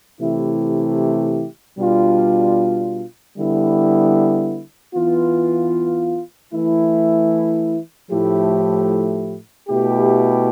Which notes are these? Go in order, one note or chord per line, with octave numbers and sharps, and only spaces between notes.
C3 E3 A3 E4 G4
B2 G3 D4 F4
D3 G3 B3 E4
E3 B3 F4
E3 A3 E4
A2 F3 A3 E4 G4
B2 A3 E4 G4